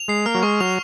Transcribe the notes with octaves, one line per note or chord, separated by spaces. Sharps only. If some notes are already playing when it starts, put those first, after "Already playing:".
Already playing: F7
G#3 C7
A#3 F6
F#3
G#3 C#6
F#3 F7